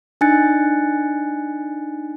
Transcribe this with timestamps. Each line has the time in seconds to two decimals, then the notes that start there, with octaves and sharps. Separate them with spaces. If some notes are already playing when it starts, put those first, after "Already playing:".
0.21 D4 D#4 G#5 F#6 A6 C#7